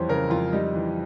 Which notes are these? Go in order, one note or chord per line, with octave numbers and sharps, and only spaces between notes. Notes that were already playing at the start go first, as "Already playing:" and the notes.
Already playing: F2 E3 G3 C5 C#5
C#3 A#4
F2 F4
G3 D#4
E3